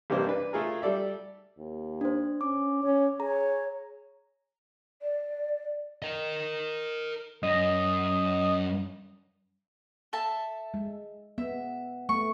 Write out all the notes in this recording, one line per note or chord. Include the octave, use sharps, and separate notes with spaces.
A1 G2 C3 A#3 C5 D#5
D4 B4
A3 F4 G#4 A#4
G3 A4 D5 E5
D#2
D4 C5
C#4 D6
C#4 C#5
G#4 C#5 A#5
D5
A#4 D#5
F#2 D#5
A4 E5 A5
G#3
B3 E5
A3 B3 C#6